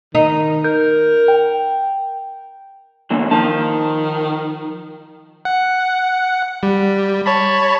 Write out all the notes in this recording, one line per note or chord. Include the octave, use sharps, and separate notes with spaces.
D#3 D#4
A#4 G6
G5
D3 E3 A#3
D#3 F3 A5
F#5
G3
C#5 A5 B5